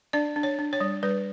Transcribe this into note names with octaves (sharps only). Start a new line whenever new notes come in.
D4 D5
D4
C#5
D4
C#5
G3
G3 B4